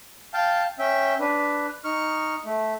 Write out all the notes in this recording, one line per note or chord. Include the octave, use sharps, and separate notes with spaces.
F5 G5 A5
C#4 E5 G5
D4 B4
D#4 C#6 F6
A3